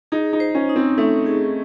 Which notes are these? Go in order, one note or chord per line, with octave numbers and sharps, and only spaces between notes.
D#4 G#4
D#4
C5
C#4
D#4
C4
A3 D#4
G#4